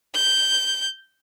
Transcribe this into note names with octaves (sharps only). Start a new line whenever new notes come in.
G6